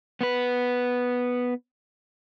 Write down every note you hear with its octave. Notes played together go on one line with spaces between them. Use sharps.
B3 B4